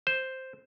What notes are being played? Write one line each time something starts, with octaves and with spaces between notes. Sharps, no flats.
C5